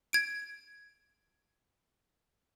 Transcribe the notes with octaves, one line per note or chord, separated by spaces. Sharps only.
G#6 D7